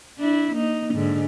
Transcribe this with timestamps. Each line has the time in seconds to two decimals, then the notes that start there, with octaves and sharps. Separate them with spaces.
0.19 D4 E4
0.55 A#3 D#4
0.94 G#2 D3